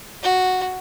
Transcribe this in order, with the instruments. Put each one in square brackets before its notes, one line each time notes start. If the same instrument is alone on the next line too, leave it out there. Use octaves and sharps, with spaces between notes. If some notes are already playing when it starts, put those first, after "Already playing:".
[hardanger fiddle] F#4